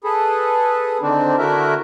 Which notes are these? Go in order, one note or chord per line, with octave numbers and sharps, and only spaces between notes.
G#4 A4 B4
D3 D#3 C4 D4
D3 A3 E4 F#4 A#4 E5